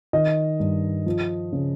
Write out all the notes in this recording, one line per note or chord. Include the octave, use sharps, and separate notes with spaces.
D#3 D#5
G2
F3
C#3